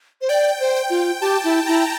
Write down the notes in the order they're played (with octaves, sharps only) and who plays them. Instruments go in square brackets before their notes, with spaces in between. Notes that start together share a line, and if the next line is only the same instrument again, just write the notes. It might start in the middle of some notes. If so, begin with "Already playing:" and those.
[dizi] C5
[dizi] D5 [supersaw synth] G5
[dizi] C5
[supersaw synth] G5
[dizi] F4
[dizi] G4 [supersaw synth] A5
[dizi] E4
[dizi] E4 [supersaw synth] A#5